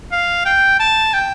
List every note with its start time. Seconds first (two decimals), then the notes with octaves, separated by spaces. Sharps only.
0.12 F5
0.46 G5
0.80 A5
1.14 G5